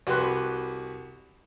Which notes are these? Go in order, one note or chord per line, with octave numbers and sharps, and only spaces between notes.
C2 F#4 G4 B4 C6 F#6